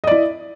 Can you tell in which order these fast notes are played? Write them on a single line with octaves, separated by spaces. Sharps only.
D#5 D5 E4